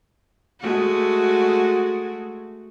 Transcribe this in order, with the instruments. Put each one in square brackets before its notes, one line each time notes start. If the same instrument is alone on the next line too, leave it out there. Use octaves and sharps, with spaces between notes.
[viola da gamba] G#3 A3 F#4